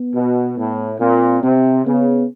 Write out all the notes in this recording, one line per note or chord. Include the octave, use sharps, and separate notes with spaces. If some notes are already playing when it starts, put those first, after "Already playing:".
Already playing: B3
B2
A2
A#2 C4
C3 C4
C#3 B3